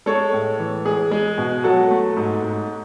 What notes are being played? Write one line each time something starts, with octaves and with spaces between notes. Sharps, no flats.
G#3 A4 C#5
A2
E3
G#3 G#4
G#3
B2
F#3 F#4 A4
A3
G#2
G#2